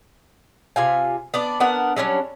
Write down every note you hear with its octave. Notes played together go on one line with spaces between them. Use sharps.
C3 F4 G#5
B3 D4 D5
B3 D4 A#4 F#5
F#3 G3 C#4 D4